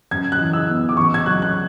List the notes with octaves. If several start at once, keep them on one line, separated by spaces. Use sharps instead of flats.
F#2 G#6
F#6
E3
E6
B3
D6
A1 C#6
G#6
F#3 F#6
F#6